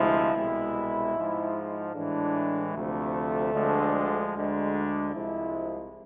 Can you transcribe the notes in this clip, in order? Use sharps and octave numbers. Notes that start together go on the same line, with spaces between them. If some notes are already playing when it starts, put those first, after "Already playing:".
Already playing: D2 C3 F3 G#3 E4
C2 B2 G#3
G#2 F3 G#3
A2 E3 G#3 D4
D2 C3 F3 A3
D2 D3 F3 G#3
D2 D3 G#3
D4
C2 C3 F3 G#3 E4